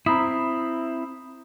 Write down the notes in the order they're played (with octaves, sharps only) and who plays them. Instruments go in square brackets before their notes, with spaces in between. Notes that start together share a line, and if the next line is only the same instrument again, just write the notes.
[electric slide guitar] C4 E4 [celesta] A#5 B5 D#6